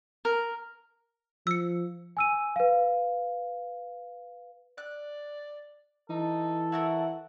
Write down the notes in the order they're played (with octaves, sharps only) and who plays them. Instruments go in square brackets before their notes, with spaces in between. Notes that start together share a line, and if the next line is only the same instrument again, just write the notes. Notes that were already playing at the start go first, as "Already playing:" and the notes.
[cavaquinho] A#4
[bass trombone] F3 [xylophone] E6 C#7
[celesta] G#5 E6 D#7
B4 F5
[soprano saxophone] D5 [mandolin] F#6
[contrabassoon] E3 [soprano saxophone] D#4 [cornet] A4
[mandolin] E4 F#4 A#4 [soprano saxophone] F#5